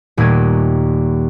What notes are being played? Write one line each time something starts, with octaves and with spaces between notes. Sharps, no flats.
D#1 D#2 A3 G#6 D#7